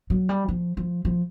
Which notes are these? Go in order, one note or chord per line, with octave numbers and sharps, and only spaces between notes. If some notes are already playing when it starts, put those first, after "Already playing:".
F#3
G3
F3
F3
F3